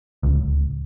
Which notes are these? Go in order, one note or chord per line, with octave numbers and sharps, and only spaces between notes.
D1 C#2